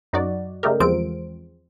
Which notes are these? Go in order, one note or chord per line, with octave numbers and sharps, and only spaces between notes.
F#2 D#4 F#4 D5
C#3 G3 A3 D#4 G4 A#4
E2 F3 G#3 C4 F4 D7